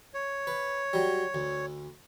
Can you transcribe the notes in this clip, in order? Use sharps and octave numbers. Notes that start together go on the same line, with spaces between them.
C#5
B4
F#3 G3
D2